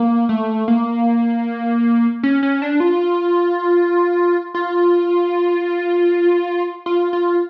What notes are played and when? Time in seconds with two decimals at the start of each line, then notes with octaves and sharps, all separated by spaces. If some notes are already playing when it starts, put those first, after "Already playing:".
Already playing: A#3
0.29 A3
0.68 A#3
2.23 C#4
2.43 C#4
2.62 D4
2.80 F4
4.54 F4
6.86 F4
7.13 F4